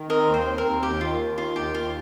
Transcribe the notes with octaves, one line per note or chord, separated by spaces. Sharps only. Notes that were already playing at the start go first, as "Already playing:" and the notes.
Already playing: D#3
C4 A#4 D#5
D#2
C5
C4
A#4
D#2
D#2 G4
D#3 F4
D#2
D#3 F4
D#2 G4
D#2 F4